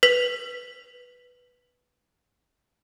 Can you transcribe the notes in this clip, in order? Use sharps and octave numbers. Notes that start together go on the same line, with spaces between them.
B4 B6 F7